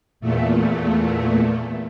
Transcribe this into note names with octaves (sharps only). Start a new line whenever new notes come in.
E2 A#2 A3